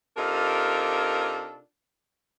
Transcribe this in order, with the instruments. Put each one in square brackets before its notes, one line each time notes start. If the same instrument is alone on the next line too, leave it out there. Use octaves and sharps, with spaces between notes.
[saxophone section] C3 D4 D#4 F4 A4 A#4